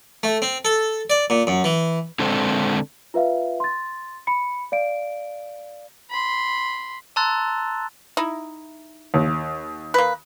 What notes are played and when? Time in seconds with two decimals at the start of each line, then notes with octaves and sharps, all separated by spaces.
0.23 A3
0.42 C4
0.65 A4
1.10 D5
1.30 A#2
1.47 F#2
1.64 E3
2.19 D3 G#3 C4 A4 C5 D5
3.14 F4 B4 E5 F5
3.60 C6 A6
4.27 B5 C#7
4.72 D5 F5 D7
6.11 B5 C6
7.16 A5 A#5 C6 E6 F#6 A6
8.17 D#4 E4
9.14 D#2
9.94 A#3 B4